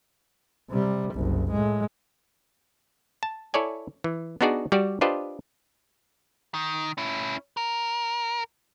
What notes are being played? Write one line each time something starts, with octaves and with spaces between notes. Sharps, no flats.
C3 G3
F#1 C2
A2 G#3
A5
E4 A4 C#5 D5 G#5
E3
B3 D4 D#4 F#4 G#4 D5
G3 F#4 G4 D5
D4 F4 G4 B4 C5 D#5
D#3
C#4 E4
A#4